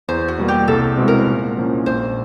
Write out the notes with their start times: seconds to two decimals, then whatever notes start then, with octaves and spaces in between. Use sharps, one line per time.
0.08 E2 C5
0.28 F#4
0.38 B2 G3 A#3
0.48 G4
0.68 C2 A4
0.98 B2 G#3 C4 E4
1.08 A#4
1.27 A#2
1.57 F3 A#3 C#4
1.86 A#1 C5